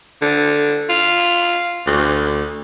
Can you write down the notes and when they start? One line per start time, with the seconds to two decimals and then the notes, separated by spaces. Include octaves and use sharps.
0.22 D3
0.90 F4
1.87 D2